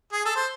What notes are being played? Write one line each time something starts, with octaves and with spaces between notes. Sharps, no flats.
G#4
A4
C5